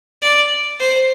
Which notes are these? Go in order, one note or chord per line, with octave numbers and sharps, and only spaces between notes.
D5
C5